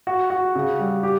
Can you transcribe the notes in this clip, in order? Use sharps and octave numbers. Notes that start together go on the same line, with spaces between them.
F#4
F#4
C#3
G3
G4